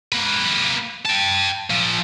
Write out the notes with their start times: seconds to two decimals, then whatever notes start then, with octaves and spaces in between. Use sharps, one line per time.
0.12 A#3 B4
1.05 G5 A5
1.70 A#2 F3